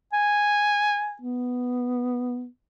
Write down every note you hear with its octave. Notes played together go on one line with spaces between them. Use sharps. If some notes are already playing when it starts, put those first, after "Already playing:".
G#5
B3